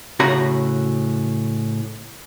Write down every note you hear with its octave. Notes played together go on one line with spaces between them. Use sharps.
A2 C#3 F#4 A#5 B5